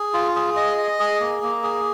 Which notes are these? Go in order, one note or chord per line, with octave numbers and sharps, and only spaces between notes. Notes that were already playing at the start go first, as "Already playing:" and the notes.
Already playing: G#4
F4
G#4
D#5
D#5
G#4
A#3
A#3
G#4